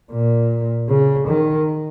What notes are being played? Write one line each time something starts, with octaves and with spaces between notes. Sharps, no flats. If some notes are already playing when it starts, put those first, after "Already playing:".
A#2
C#3
D#3